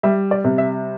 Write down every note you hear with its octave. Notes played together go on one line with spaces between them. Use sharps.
G3 E5
D5
C3
E5